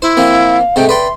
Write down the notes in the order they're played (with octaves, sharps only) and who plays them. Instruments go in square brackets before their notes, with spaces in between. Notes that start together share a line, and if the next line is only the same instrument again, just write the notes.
[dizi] E4 [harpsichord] C5
[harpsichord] F3 A#3 C4 [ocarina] F5
[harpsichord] G#2 C3 A3 [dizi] G5
[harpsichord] B4 D5 G5 [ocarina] E5 [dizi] C6